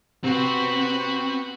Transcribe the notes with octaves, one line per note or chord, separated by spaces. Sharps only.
C3 B3 C4 F#4